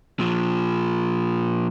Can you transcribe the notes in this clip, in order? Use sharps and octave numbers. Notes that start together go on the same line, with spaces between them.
A#2 F3